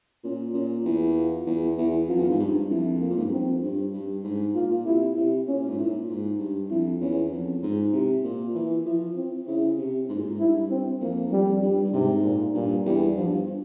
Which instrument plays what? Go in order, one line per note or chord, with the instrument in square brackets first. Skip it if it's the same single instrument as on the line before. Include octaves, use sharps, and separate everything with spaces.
[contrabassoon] A#2 [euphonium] C#4
[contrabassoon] A#2 [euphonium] C#4
[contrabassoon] E2 [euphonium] E4
[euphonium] F4
[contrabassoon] E2
[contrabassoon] E2 [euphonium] E4
[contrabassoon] F2 [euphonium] F4
[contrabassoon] E2
G#2
G2
G2
[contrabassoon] F2 [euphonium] E4
[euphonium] A#3
[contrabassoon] A#2
G#2
G2
[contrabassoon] F2 [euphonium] C4
[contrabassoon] G2
G2
G#2
[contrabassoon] A#2 [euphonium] F4
[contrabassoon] A#2
[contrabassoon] C3 [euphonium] E4
[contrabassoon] C3 [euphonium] E4
[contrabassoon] A#2 [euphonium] C#4
[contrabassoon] G#2
[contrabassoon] A#2 [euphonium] E4
[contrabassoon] G#2
G2
[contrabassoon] F2 [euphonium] E4
[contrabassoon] E2 [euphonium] C#4
[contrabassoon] F2
G#2
[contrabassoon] C3 [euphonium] E4
[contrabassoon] A#2 [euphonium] F4
[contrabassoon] E3 [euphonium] E4
[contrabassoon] F3 [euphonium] E4
[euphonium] C4
[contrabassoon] C#3 [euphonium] E4
[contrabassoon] C3
G#2
A#2
G#2
[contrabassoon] G2 [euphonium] E4
[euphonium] C4
[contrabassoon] F2 [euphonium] A#3
[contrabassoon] G2
[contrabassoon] F2 [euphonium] G3
[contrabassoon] G2 [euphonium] G3
[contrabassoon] G2
[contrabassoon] G#2 [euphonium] C3
[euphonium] A#2
[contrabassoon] G2 [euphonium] A#2
[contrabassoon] E2 [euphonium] G3
[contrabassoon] G2 [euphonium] F3